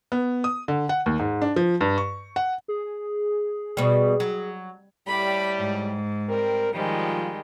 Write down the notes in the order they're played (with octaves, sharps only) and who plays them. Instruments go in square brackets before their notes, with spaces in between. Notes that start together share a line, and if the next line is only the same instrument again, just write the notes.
[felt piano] B3
D#6
D3
F#5
D#2
G#2
D4
F3
G2
C#6
F#5
[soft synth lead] G#4
[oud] B2 G3
F#3
[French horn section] A2 G3 [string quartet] B5 D6
[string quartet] G#2
[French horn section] G3 C4 A#4
[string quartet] D#3 G3 G#3 [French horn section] F3